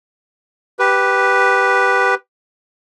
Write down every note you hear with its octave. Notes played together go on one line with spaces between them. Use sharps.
G4 B4